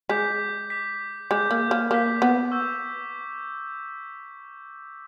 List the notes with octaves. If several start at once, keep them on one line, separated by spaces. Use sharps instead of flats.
G#3 D6 G6 B6
D6 G6 B6
G#3 D6 G6 B6
A#3
A#3
A#3 D6 G6 B6
B3
C#6 E6 G6